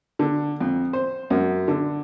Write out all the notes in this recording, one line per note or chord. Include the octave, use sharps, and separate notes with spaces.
D3
F2
C5
F#2
D3